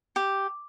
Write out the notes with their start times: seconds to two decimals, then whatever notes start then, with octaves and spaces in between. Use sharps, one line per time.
0.16 G4